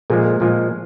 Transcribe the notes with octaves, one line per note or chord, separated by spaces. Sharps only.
A#2 F3 G#3 G#4
A#2 F3 G#3